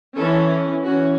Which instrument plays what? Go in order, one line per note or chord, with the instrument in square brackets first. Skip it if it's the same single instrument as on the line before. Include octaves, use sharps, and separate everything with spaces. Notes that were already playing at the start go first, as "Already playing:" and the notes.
[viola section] E3 C#4 A4
E3 C#4 F#4